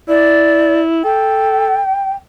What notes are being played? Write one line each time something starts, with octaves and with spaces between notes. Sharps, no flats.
E4 D5
A4 G5